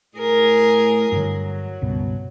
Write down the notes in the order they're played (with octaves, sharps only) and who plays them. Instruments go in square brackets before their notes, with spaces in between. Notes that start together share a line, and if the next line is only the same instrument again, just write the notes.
[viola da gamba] A2 G#4 A#4
[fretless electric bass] G2 D3 [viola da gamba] F#3
[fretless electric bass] C#2 G2 B2